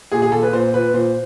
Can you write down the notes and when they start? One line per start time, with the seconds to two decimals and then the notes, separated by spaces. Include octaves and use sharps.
0.12 A#2 G#4
0.22 G#4
0.32 A#2 A4
0.43 B4
0.53 A#2 C5
0.73 A#2 B4
0.94 A#2 C5